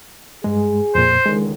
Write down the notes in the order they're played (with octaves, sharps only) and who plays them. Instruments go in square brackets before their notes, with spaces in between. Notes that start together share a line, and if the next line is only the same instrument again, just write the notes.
[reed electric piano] G2 G#3 [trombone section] G#4
[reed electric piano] F2 A#2 [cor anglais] C5
[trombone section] C#2 D3 D#3 [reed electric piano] G#3